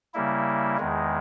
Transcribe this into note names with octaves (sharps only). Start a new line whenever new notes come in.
C#3 G3 A#3 E4
E2 D#3 G#3